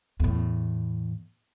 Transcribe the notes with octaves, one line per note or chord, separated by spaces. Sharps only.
E2 A2